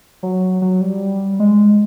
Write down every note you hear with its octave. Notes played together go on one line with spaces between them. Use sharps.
F#3
F#3
G3
G#3